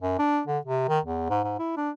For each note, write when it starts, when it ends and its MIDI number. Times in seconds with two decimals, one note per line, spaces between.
0.02 0.15 42
0.19 0.41 62
0.47 0.58 50
0.65 0.88 48
0.89 0.99 51
1.05 1.29 40
1.30 1.41 44
1.44 1.55 44
1.59 1.76 64
1.77 1.90 62